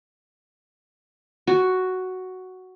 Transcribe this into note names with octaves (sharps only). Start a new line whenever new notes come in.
F#4